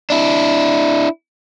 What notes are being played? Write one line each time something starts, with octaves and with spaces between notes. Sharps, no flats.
D4 E4